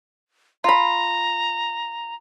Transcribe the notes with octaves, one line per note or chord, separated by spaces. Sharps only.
F4 A#5 B5